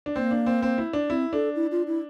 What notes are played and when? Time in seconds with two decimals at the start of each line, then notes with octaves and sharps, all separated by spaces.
0.06 D4
0.16 A#3 C4
0.31 D4
0.46 C4
0.62 C4
0.78 E4
0.93 D4
1.09 C4 E4
1.33 D4 A4
1.55 E4
1.72 F4
1.87 E4